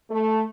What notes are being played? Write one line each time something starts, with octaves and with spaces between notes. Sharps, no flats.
A3